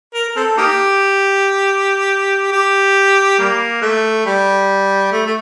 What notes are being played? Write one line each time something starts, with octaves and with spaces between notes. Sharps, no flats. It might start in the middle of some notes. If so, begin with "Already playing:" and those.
A#4
A#4
C4 A4
A#3 D#4 G4
G4
G3 A#3
A3
G3
A3
A3